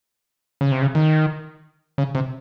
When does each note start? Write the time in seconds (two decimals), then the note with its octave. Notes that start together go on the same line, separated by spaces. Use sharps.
0.61 C#3
0.72 C3
0.82 C#3
0.95 D#3
1.98 C#3
2.15 C3